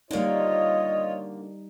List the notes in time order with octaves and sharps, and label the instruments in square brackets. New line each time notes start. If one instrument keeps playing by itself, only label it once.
[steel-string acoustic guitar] D3 A#3 [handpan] G3 D#4 [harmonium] F4 C#5 [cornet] D#5